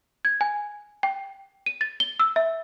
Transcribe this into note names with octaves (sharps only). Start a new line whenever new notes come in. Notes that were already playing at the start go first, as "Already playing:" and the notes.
G#6
G#5
G5
D#7
A6
G7
E6
E5